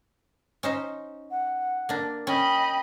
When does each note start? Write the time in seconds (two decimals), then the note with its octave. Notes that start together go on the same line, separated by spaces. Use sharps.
0.63 C#4 D#4 C5
1.31 F#5
1.89 A#3 D4
2.27 C#4 D#5 G5 B5